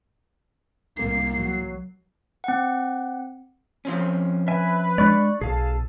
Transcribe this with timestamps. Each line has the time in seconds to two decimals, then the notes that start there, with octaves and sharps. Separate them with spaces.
0.97 C2 A#3 C7
1.34 F#3
2.44 C4 F#5
3.85 F3 C4 C#4
4.48 B4 E5 G#5
4.98 G#3 D4 D5 C#6 F#6
5.41 B1 G#4 A4 F5 A5